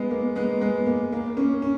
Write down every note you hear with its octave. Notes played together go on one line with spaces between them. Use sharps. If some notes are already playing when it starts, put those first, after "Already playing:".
Already playing: G#3 B3
A#3
G#3 B3
G#3 B3
A#3
A#3
A#3 C#4
C#4